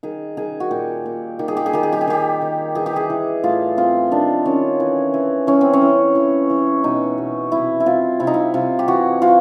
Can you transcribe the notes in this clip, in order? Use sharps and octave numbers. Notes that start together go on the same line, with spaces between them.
D#3 G#4
D#3 G#4
F#4
A#2 G4
A#2
D#3 G4
G#4
G4
G#4
D#3 G4
G#4
G4
G#4
D#3 G4
D#3
E3 G#4
G4
G#4
E3
A2 F4
C4 F4
D#3 D4
D#3 C#4
E3
E3
E3 C#4
C4
C#4
E3
E3
E3
B2 D#4
B2
C3 E4
E4
C4 F4
C3 E4
D#4
E4
C3 F4
G4
E3 F#4
E3 F4